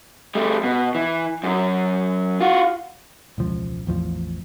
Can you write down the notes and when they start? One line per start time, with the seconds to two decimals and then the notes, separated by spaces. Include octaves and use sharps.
0.35 G3 A3
0.64 B2
0.95 E3
1.44 F#2 F#3
2.41 F4 F#4
3.38 E1 C#2 F3
3.87 A1 E2 F3